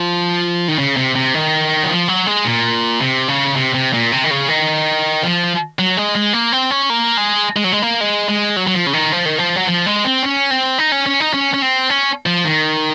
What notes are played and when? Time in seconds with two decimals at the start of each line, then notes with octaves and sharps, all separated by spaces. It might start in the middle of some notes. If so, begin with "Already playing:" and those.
Already playing: F3
0.68 D#3
0.79 C#3
0.97 C3
1.15 C3
1.34 D#3
1.84 F#3
1.89 F3
2.08 F#3
2.27 G#3
2.45 A#2
3.01 C3
3.28 C#3
3.56 C3
3.74 C3
3.93 A#2
4.12 C3
4.24 D#3
4.31 C#3
4.49 D#3
5.23 F3
5.79 F#3
5.97 G#3
6.15 G#3
6.33 A#3
6.52 C4
6.71 C#4
6.90 A#3
7.17 G#3
7.57 G#3
7.64 F#3
7.72 G#3
7.82 A#3
8.01 G#3
8.29 G#3
8.56 F#3
8.67 F#3
8.75 F3
8.86 C#3
8.93 D#3
9.12 F3
9.26 D#3
9.38 F3
9.56 F#3
9.67 F3
9.86 G#3
10.05 C4
10.23 C#4
10.51 C4
10.78 D#4
10.92 C#4
11.06 C#4
11.20 D#4
11.34 C#4
11.54 C#4
11.62 C4
11.90 C#4
12.26 F3
12.45 D#3